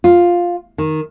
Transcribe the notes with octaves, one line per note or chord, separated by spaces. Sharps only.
F4
D#3